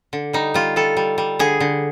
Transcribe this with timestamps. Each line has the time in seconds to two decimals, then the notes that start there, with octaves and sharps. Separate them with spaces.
0.13 D3
0.33 G3 D#4
0.54 G3 F4
0.76 G3 A4
0.97 G3
1.18 G3
1.39 D3 G#4
1.60 D3